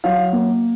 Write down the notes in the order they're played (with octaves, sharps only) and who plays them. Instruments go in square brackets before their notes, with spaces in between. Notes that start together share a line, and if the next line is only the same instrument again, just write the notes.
[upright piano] F#3 F5
A#3